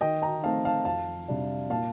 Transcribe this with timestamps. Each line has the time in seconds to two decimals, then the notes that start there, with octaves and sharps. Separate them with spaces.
0.01 D#3 D#5 G5
0.22 G5 A#5
0.43 A3 C4 D#4 F5 A5
0.65 F5 A5
0.85 F2 F5 A5
1.28 C3 G3 D4
1.70 A#2 F5 A5